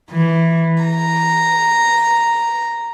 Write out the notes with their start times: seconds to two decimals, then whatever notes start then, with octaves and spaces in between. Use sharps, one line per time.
0.11 E3
0.84 A#5